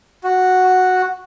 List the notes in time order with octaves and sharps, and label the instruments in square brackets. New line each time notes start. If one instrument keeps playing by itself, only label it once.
[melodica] F#4